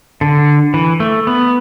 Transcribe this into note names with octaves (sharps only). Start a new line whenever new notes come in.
D3
E3
A3
B3